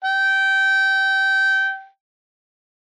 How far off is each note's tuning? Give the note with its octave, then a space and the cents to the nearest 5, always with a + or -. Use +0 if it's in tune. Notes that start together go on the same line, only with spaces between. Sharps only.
G5 -20